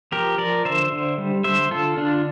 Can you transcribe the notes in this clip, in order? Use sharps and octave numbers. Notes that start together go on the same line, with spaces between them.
F3 G4 A#4
F3 A#4 D5
D3 C5 E5
D3
G3
D3 C5 E5
D3 F4 A4
D3 D4 F4